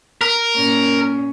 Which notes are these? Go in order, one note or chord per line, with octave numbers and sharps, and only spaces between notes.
A#4
A#2 C#4